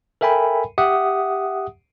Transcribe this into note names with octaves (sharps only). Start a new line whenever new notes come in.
A4 A#4 E5 G5 G#5 B5
G4 E5 F#5 D#6